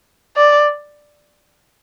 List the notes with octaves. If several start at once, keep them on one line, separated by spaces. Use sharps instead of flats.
D5